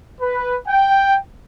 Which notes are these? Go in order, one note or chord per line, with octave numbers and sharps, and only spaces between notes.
B4
G5